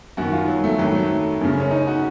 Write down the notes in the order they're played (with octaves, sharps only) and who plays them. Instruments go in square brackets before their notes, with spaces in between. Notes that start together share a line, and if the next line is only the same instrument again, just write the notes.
[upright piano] F#2 D#3 F#4
F4
F#3
A3
F2 D#3 F#3
A3
F#2 C#3
C#4
D#4
F#4